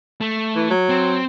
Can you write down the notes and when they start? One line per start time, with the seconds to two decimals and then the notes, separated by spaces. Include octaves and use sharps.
0.21 A3
0.56 E3
0.70 F#3
0.89 C4